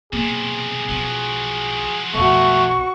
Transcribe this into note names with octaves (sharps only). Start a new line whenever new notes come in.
B1 C3 A#3 G#4
B1 F3 F#3 C#4
B1 F2 A3 F#4 C#6